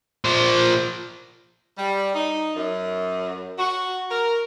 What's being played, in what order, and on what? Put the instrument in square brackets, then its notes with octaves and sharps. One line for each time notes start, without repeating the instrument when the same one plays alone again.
[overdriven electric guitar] A#2 F3
[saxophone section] G3
D#4
F#2
F#4
A#4